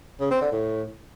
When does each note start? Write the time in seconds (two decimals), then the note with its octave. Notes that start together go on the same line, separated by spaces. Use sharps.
0.20 C#3
0.31 C4
0.41 D3
0.52 A2